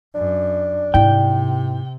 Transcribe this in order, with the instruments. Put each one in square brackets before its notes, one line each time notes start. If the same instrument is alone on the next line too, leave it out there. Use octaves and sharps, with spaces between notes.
[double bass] F#2 [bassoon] D4
[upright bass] G#2 E4 [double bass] C3 [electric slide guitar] G5